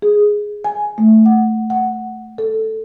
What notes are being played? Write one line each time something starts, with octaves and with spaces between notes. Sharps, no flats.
G#4
G#5
A3
F#5
F#5
A4